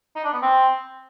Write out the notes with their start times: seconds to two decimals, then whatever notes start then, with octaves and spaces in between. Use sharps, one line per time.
0.16 D#4
0.24 D4
0.33 B3
0.42 C4